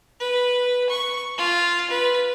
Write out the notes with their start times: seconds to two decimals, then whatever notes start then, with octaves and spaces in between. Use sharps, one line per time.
0.20 B4
0.90 C#6
1.38 F4
1.91 B4